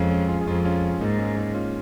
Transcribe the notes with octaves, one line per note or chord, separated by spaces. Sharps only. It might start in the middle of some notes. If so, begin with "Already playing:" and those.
Already playing: F2 G#3 C#4
G#3 C#4
C#4 F4
G#4
F2 C#4 F4
C#4 F4
G#2 A#3 D#4
G#3 C#4
A#3 D#4
C#4 F4